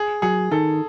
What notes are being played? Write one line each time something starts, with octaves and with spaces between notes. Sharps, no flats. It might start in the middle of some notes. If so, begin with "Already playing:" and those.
Already playing: G#4
F#3 G#4
D#3 A4